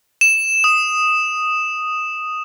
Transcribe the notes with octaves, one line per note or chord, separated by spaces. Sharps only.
E7
D#6